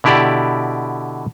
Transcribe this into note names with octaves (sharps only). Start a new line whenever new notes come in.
B2 D3 E4 G4 D5